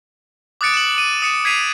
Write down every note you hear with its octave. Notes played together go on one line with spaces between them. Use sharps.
D6 D#6 F#6 A6 C#7 D7
E7 F#7
D#7
D#6 C#7 E7
G#6 B6 C7 D#7 F7